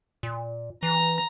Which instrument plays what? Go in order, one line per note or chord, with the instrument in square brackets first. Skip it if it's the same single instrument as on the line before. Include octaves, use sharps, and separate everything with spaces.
[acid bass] A#2
[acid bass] E3 [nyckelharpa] A#5